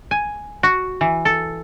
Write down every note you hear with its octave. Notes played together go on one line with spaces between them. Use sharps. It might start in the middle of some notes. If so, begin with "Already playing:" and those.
G#5
F#4
E3
A4